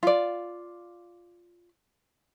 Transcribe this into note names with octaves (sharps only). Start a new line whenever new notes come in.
F4 D5